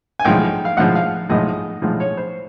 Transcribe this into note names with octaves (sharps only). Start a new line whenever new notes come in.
G#5
B1 A2 F3 G#3 G5
F5
B1 A2 F3 G#3 F#5
F5
B1 A2 F3 G#3 D#5
B1 A2 F3 G#3
C#5
C5